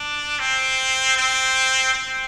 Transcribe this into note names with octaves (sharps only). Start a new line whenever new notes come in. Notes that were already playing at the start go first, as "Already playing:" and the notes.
Already playing: D4
C4
C4
C4